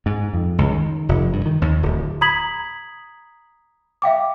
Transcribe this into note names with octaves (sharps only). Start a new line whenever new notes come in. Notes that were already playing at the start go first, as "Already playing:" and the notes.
G#2
F2
C#2
D#3
F1
G2
D#3
D#2
D1
A#5 B5 D#6 G#6 B6 F#7
E5 F5 G5 D6